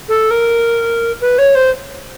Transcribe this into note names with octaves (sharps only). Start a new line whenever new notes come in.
A4
A#4
B4
C#5
C5